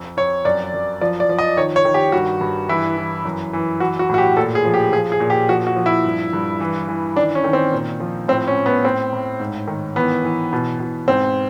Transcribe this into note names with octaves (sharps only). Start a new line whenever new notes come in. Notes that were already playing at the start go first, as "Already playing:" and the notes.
Already playing: F2
F2 C#5
F#2 D5
F#2
F3 D5
D5
F3
D#5
D#3 C#5
C#5
D#3
G4
G2 F#4
G2
E3 E4
E3
F#2
E3
E3 F#4
F#4
A2 F#4
G4
A#2 A4
G#4
F3
G4
F3 G#4
G#4
A#2
G4
F3 F#4
F#4
F3
E4
G2
G2
E3
E3
D#3 D4
C#4
D#3
C4
A#2
F3
A2 C4
C#4
A2
B3
A2 C4
A2
G#2
D#3
E3 B3
E3
B2
B2
G#2 C4